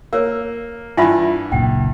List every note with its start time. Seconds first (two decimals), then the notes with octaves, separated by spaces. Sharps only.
0.13 A#3 C#5 F5 E6
0.97 G2 E3 E4 F4 E5 F#5 G#5 B5
1.52 F#1 C#2 A#2 F#5 G5